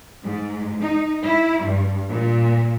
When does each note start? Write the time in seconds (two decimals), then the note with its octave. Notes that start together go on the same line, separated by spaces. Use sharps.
0.25 G#2
0.82 D#4
1.24 E4
1.63 G2
2.08 A#2